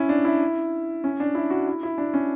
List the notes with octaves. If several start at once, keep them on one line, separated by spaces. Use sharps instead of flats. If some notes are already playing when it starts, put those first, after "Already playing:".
Already playing: C#4 E4
D4
E4
C#4
D4
E4
F#4
E4
E4
D4
C#4